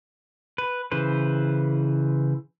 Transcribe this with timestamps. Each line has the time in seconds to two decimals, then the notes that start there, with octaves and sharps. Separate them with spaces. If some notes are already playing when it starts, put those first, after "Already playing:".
0.58 B4
0.92 C#3 E3 B4 C5